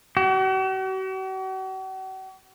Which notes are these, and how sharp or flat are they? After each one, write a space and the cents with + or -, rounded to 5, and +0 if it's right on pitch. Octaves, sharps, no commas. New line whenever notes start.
F#4 +45